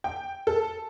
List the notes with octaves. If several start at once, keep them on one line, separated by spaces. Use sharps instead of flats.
G5
A4